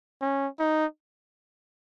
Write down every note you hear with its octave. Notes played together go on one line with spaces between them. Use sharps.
C#4
D#4